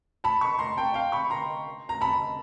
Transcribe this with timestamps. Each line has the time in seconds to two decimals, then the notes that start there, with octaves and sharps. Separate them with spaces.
0.24 A5 B5
0.41 B5 C#6
0.59 A#5 C6
0.77 G5 A5
0.94 F5 G5
1.12 B5 C#6
1.30 A#5 C6
1.89 A#5
2.01 A5 B5